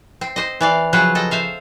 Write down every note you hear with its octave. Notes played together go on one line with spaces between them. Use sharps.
C4
C5 D#5
E3 D5 F5
C#3 F3 F#3 B4 C5 G5
A4 D#5 G5
C5 E5 F5